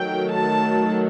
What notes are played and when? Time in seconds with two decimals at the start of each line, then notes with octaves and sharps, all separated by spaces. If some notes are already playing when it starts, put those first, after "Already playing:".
Already playing: D#3 F#3 A3 G5
0.33 A5